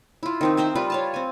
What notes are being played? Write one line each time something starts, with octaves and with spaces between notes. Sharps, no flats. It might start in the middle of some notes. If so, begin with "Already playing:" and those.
E4 F4
D#3 C4 D#4
A#4 C5 D#5 E5
G3 F4 B4
C#5 F5 A5
C4 G#5